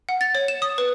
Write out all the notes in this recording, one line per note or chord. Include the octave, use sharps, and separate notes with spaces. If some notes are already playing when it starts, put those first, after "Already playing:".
F#5
A6
C#5
E7
D#6
B4